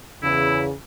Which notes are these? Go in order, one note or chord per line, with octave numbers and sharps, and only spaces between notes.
E2 C#3 E4